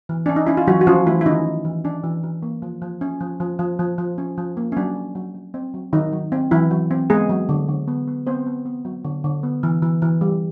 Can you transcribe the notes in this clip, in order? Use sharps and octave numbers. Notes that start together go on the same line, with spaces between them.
E3
C#4 D4
D#4
C#4 E4
F4
E3 F#3 F#4
F#4
F3 C#4 F4
E3 A3 E4
E4
D#3 C#4 D#4
C#4
E3
C#4 D4
E3
E3
A#3
F3
F3
C#4
F3
F3
F3
F3
F3
C#4
F3
A#3
C#4
F#3 D4
F#3
F#3
F#3
C4
F#3
D#3 F#3 D#4
F#3
C4
E3 F#3 E4
F#3
C4
G#3 B3 G#4
F#3
D3
D3
B3
B3
B3 C4 C5
B3
B3
F#3
D3
D3
B3
E3
E3
E3
G3